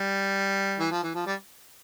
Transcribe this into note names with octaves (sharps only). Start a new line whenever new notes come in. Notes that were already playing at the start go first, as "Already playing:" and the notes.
Already playing: G3
E3
F3
E3
F3
G3